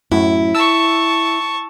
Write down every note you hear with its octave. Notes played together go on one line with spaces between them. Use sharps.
F#2 A2 E4
A5 C#6 E6